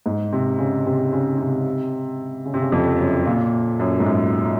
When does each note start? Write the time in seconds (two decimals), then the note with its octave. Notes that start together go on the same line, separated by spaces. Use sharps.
0.06 G#2
0.32 C3
0.59 C#3
0.86 C3
1.13 C#3
1.38 C3
2.46 C#3
2.54 C3
2.62 C#3
2.72 F2
3.00 F#2
3.26 A#2
3.80 F#2
4.00 G#2
4.06 F#2